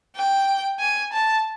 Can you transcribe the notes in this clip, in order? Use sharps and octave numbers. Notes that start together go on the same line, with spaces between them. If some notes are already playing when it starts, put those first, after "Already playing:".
G5
G#5
A5